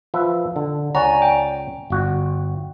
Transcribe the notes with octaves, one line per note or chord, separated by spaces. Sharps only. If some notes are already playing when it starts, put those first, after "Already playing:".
F3 B4 E5
D3
C#2 C#5 D5 F#5 G#5 A#5
G5
G1 F#4